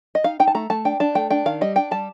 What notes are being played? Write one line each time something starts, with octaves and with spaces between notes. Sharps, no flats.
D#5
D#4 F5
D#4 G5
A5
A3 A#5
A3 A5
D4 G5
D4 A5
A3 G5
D4 G5
D#3 F5
G3 D#5
D4 G5
G3 A5